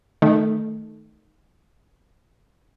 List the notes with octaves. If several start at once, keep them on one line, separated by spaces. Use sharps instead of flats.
D#3 A3